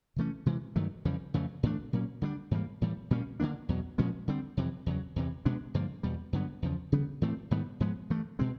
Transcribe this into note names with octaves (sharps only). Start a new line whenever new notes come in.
C3 E3 A3 C#4
C3 E3 G#3
G2 D#3 F#3 A3
F2 C#3 E3 G3
F2 C#3 E3 A3
A2 E3 A3 D4
A#2 F#3 A#3 C#4
D3 G3 A#3 D4
G#2 E3 G3 A#3
A2 E3 G3
A#2 G3 A#3 C#4
D3 F#3 A#3 D4
E2 B2 F#3
A#2 F3 G#3 C#4
D3 G3 C4
F2 C3 E3
E2 C#3 F#3
E2 C3 E3
B2 G#3 B3 D4
G2 D3 F3 A#3
E2 B2 G3
G2 D3 F#3 B3
E2 C#3 F3
C#3 E3 G3 B3
A2 E3 A3 C4
G#2 D#3 G3 B3
G#2 F3 G#3 B3
G2 E3 A3
B2 G#3 C4